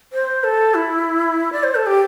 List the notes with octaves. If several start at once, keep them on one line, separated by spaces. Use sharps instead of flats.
C5
A4
E4
D5
C5
A4
G4